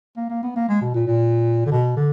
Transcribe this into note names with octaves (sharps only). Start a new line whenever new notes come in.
A#3
A#3
B3
A#3
G#3
B2
A#2
A#2
D3
B2
D3